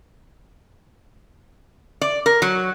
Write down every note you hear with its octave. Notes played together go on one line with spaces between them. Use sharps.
D5
A#4
F#3